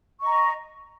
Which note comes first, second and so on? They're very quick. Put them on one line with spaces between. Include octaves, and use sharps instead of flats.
C#6 D#5 A#5